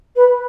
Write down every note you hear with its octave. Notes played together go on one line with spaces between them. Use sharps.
B4